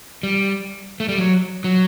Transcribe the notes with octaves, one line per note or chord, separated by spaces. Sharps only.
G3
A3
G3
F#3
F#3